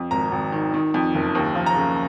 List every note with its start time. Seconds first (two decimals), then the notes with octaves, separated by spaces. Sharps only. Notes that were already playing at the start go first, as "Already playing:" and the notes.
Already playing: F2
0.11 G#1 A#5
0.32 G#1
0.52 D#3
0.74 D#3
0.94 F2
1.15 F#1
1.35 D#2
1.55 F3
1.66 A#5
1.76 C#3